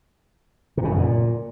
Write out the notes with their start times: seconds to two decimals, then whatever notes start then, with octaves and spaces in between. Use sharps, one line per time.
0.77 C3
0.84 C#3
0.92 F#2
0.99 A#2